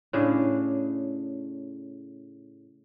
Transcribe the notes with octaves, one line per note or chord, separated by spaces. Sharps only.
A2 C#3 D4 G#4